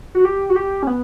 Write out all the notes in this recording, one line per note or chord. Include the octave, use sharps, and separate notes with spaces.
F#4
G4
F#4
G4
C#4
B3